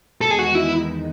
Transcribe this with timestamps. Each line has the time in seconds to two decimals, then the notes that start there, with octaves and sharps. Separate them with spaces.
0.21 E2 D#3 G#3 B3 D#4 A4
0.30 G#4
0.39 F#4
0.55 E4